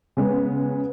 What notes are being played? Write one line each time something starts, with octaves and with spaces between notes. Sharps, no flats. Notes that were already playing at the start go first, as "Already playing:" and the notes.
C#3 G#3 B3